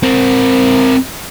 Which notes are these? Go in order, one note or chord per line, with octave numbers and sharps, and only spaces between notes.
C4 A#4